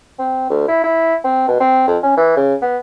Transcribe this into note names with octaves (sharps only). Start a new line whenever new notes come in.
C4
D2
E4
E4
C4
B2
C4
F2
C#4
E3
C#3
B3